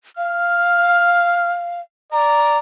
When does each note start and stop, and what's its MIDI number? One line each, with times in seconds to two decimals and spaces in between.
0.17 1.81 77
0.17 1.65 89
2.12 2.59 74
2.12 2.58 82